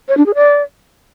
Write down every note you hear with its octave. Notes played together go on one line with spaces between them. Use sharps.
C#5
D4
G#4
D5